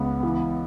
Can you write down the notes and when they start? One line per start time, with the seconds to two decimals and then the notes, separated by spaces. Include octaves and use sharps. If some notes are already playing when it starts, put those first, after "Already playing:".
Already playing: C#2 B3
0.23 E3